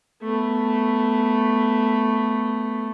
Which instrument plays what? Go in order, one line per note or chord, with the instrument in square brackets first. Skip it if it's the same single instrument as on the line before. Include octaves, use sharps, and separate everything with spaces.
[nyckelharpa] A3 B3